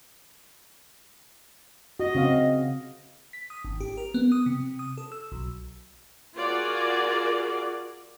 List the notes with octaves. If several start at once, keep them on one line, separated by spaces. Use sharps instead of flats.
F#4 D#5
C#3 C4 F5
B6
D#6
G#1
G4
A#4
B3
D#6
C3
D#6
A4
E6
B1
F4 F#4 G#4 A#4 D5